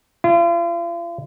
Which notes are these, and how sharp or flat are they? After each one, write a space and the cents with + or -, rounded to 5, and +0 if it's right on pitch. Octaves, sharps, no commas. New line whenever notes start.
F4 -40